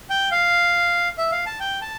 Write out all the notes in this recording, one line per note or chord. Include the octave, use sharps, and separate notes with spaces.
G5
F5
E5
F5
A5
G5
A5